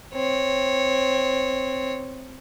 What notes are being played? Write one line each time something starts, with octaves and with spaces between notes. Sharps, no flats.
C4 C#5